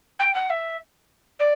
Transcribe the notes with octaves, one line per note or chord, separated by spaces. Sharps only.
G5
F#5
E5
D5